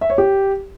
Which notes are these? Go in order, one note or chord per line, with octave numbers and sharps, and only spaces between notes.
E5
C#5
G4